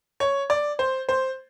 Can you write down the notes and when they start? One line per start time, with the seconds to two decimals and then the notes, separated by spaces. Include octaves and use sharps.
0.20 C#5
0.50 D5
0.79 C5
1.09 C5